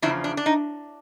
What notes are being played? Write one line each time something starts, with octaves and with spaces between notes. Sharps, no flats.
E2 C#3 F3 D4 E4
D4
D4
D#4